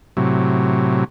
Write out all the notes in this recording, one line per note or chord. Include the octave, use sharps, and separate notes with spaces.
A2 C3 F#3